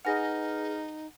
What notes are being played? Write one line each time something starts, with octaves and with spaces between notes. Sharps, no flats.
D#4 G#4 B4 F#5 G#5 F6 A#6